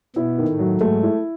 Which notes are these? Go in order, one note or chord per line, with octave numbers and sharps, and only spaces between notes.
B2 B3 E4
D#3
A2 A3
F#3
G#2 G#3 A3
E4